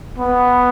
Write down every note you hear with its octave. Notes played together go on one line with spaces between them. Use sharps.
B3